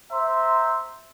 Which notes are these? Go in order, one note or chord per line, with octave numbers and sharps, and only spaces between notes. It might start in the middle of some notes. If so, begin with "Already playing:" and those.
C5 E5 A#5 C6